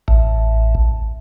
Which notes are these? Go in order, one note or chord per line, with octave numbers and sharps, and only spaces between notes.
A1